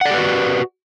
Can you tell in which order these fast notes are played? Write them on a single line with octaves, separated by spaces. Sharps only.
F#5 D5 G4 B4 F#4